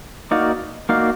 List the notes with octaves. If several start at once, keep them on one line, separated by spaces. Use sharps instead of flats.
A#3 D#4 F#4 D5 F5
A#3 D#4 F#4 D5 F5